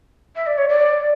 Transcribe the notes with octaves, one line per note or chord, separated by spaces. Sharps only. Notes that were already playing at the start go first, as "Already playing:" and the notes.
E5
D5
C#5
D5